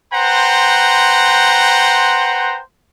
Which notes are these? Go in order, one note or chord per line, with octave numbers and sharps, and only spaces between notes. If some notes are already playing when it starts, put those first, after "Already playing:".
B4 C5 F#5 G5 A#5 C6